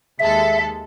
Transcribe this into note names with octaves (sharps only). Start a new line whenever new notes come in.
D#2 G#3 A4 E5